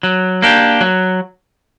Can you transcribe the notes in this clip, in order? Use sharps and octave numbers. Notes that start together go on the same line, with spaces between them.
F#3
A#3 D4 G4
F#3